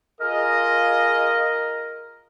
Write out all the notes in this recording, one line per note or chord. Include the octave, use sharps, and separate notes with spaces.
F4 G#4 A#4 D#5